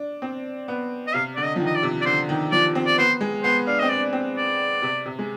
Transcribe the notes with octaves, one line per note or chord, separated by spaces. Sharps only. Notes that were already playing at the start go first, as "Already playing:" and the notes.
Already playing: D4
C4
B3
D#5
C3 F5
D3 D5
D#5
F3
D#3
D#5
D5
C3
D5
D3 C5
D#3
F3 D5
C4
D5
B3 C5
G#3
B3 C5
D4 F5
C4 D#5
D4 D5
C4
D5
C3
C3
G#3